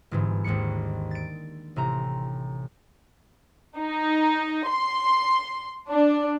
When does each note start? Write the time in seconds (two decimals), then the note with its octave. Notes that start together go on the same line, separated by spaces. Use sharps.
0.11 G1 G#2 E3
0.44 G#1 D#2 G#3 D4 C#7
1.11 A6 D7
1.76 A1 C3 A#5
3.78 D#4
4.69 C6
5.90 D4